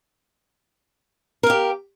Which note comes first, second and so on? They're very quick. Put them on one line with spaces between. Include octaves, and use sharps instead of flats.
A#4 F5 G4